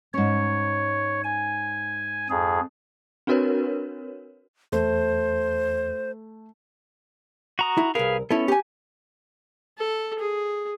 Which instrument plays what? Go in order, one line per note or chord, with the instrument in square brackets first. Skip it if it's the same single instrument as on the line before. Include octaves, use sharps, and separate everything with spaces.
[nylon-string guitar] G#2 C#4 [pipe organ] C#5
[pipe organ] G#5
F2 G#4
[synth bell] C4 D4 F#4 A#4 B4 C#5
[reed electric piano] E2 [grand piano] A3 [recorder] C5
[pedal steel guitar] F#4 A#5 D#6
[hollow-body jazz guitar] E4
[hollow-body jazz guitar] C2 A#4 [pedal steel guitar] G#4 B4 F5
[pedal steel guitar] B3 C#4 [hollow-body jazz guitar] E4 A4
[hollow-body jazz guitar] G4 G#5
[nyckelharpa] A4
G#4